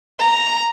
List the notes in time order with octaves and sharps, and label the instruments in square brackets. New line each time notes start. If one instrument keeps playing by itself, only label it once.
[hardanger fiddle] A#5